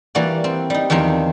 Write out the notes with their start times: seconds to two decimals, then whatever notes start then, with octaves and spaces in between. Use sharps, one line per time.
0.15 E3 G3 A#3 F#4 D5
0.44 C4
0.70 G3 D#4
0.90 E2 D#3 F3 C4 C#5